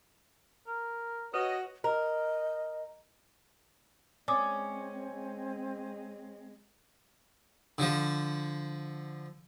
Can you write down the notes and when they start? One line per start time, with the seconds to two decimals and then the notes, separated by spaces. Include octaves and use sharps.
0.67 A#4
1.34 F#4 B4 C#5 D#5
1.84 A#4 D#5
4.28 G#3 C4 C#4 D5 D6 D#6
5.10 G#3
7.78 D3 F3